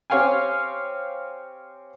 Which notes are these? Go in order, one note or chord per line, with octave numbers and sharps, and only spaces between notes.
C4 G4 C#5 F5 G5 G#5